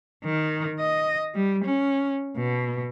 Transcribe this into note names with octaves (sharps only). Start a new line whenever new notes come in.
D#3
D#5
G3
C#4
B2